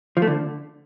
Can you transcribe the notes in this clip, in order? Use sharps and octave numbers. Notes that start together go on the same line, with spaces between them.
F3
A3
D3